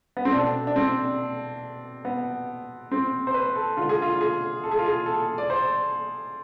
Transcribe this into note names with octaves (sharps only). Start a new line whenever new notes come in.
B3
C4
B2 A3 D4
D4
C4
B3
C4
C5
B4
A4
D3 G#3 F4
G#4
F4
G#4
A4
G#4
F4
G#4
A4
D5
C5